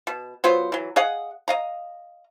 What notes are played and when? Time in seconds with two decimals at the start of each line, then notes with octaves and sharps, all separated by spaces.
0.07 B2
0.44 F#3 B3 F4 C5
0.72 E3 F#3
0.96 G#4 D#5 F5 F#5
1.48 D#5 F5 A#5